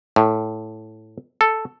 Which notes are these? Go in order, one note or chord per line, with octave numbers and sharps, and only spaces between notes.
A2
A4